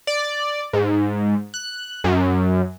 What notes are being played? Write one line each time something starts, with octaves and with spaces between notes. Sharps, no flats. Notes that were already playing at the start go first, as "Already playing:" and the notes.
D5
G#2
F#6
F#2